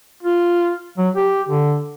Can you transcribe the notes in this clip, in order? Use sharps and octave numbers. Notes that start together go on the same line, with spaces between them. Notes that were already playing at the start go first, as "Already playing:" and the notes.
F4
F#3
G4
D3